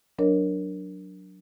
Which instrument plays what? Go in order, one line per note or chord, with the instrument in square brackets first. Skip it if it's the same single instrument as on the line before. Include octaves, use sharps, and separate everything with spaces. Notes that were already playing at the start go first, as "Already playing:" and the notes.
[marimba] F#3 D4 A#4 C#5 D#5